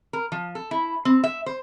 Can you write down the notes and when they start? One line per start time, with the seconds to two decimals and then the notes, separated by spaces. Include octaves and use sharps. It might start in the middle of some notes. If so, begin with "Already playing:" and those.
0.13 A#4
0.32 F3
0.55 A4
0.71 E4
1.05 C4
1.24 E5
1.46 C5